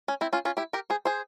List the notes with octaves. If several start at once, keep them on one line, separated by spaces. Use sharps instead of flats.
C#4
C4 E4
C#4 F4
C#4 F4
E4 G4
G4 A#4
G#4 C5
G#4 C5